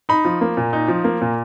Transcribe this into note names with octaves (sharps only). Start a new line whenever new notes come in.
D#4 B5
F3
A#3
A#2
D#4
F3
A#3
A#2